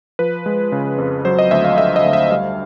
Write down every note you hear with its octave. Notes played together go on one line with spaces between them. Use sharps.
F3 B4
G#3
C#3
F2
F#3 C5
D#5
D2 E5
F5
D3 E5
D#5
D2
E5
G3 F5